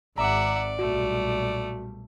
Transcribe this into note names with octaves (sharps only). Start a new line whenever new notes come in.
G#1 D5 E5 F#5 A#5 D6
B1 A#2 G3 A3 F#4